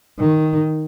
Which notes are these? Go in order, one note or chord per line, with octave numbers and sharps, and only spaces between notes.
D#3